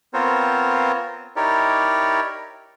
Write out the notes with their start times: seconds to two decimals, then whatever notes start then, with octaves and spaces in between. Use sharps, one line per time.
0.14 B3 C4 F4 A#4 C5 C#5
1.36 D#4 E4 G4 A#4 C#5 D5